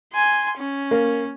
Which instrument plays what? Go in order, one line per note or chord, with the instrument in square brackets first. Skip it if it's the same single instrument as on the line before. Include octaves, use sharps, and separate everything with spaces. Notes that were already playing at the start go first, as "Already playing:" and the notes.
[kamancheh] G#5 C6
C#4
[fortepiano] A#3